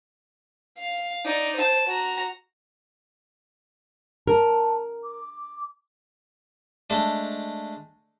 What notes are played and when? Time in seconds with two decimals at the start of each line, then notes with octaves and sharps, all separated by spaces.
0.79 F5
1.25 D#4 D5
1.57 C5 A5
1.88 F#4 A#5
4.27 A#4 A5
5.04 D6
6.90 G#3 A3 D4